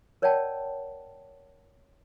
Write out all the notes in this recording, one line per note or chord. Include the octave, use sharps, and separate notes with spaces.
A#4 C#5 D5 F#5 G5 A5